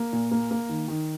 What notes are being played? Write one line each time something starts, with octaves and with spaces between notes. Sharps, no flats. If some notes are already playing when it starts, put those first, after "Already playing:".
Already playing: A#3
A#2
A#3
A#3
D#3
D#3